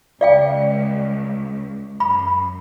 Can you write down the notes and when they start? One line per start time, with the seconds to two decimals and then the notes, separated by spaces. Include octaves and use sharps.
0.21 C#2 D5 F5 G5
2.00 F#2 B5